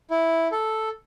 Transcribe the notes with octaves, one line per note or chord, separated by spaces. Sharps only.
E4
A4